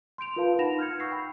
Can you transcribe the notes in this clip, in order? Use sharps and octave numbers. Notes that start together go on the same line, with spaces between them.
C6 G6 D7 F7
F4 A#4 B4 F5 A5
D#4 F#5 B5 A#6 E7 F7
F6 G6 G#6 C#7
C#6 E6 A#6 C7
G5 B5 G6